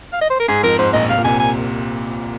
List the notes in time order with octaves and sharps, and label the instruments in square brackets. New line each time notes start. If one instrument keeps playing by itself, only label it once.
[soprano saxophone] F5
D#5
C5
A#4
[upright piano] G#2 [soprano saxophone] G#4
[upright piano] F2 [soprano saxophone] A#4
[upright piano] G#2 [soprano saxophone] C5
[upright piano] A#1 A#2 [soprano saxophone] D#5
[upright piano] C3 [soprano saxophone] F5
[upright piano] A#2
[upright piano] C2 C3 [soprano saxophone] G#5
[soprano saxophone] G#5